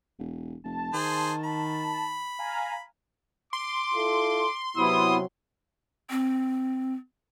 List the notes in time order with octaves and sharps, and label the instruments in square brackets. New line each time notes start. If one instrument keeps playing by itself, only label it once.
[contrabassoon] E1
[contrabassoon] F1 [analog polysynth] A5
[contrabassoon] D#3 [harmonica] G#4 C5
[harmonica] B5
[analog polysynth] F5 G#5 A#5
[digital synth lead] C6 [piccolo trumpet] D6
[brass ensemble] E4 F4 A4
[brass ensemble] C3 F#3 [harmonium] B3 E4 [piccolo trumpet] D#6
[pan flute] C4